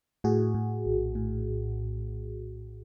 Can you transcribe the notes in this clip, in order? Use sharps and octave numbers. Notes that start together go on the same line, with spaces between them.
A2 F#4 G#4
A2
A#1
A2